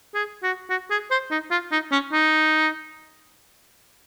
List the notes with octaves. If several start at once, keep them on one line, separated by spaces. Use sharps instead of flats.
G#4
F#4
F#4
G#4
C5
D#4
F4
D#4
C#4
D#4